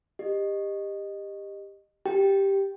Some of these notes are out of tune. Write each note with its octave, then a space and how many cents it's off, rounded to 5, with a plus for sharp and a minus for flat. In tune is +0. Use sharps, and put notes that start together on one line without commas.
G4 +20 D#5 -15
G4 +0 G5 +0